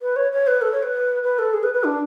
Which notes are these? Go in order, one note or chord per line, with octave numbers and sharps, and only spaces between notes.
B4
C#5
C#5
B4
A4
C#5
B4
B4
A4
G#4
B4
B4
D4